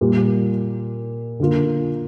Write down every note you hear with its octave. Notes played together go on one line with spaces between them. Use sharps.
A#2 G3 A#3
D3 A#3 F4